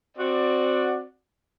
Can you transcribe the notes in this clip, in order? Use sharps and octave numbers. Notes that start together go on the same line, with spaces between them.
C4 F#4 D5